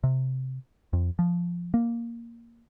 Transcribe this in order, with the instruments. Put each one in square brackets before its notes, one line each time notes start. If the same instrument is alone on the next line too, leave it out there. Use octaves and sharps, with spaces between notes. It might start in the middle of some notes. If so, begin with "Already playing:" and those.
[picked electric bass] C3
F2
F3
A#3